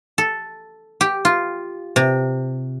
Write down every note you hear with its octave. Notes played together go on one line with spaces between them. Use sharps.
A4
G4
F4
C3